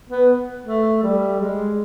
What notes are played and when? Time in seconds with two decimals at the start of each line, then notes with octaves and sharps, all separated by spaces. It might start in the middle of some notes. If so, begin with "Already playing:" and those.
0.09 B3
0.65 A3
1.03 G3
1.39 G#3